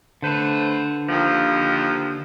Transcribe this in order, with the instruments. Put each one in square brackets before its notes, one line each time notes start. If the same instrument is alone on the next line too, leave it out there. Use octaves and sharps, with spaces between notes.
[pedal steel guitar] D3 [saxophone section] A3 B4 C5
[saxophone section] D#2 F3